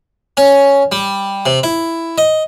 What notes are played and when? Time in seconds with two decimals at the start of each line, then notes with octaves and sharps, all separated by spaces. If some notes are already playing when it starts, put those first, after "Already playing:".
0.37 C#4
0.92 G3
1.46 C3
1.63 E4
2.18 D#5